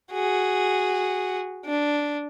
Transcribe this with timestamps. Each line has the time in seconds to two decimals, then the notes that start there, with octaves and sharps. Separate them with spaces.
0.12 F#4 G#4
1.65 D4